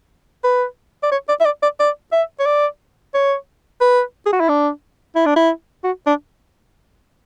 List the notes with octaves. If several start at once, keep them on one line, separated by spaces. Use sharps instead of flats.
B4
D5
C#5
D5
E5
D5
D5
D5
E5
C#5
D5
C#5
B4
G#4
F#4
E4
D4
E4
D4
E4
F#4
D4